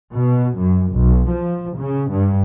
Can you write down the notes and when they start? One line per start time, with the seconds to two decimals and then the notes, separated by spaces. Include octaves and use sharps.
0.13 B2
0.58 F#2
0.91 B1
1.30 F3
1.78 C#3
2.13 G2